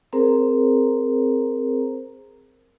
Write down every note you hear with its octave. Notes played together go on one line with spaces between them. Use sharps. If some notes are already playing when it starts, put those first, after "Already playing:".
C4 G#4 A#4 C5 A#5